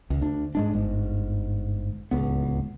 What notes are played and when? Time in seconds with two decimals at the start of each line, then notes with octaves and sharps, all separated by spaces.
0.10 C#2
0.22 D2 D4
0.55 G#2 G#3 D4
0.74 G1 G#2
2.11 D1 C#2 B3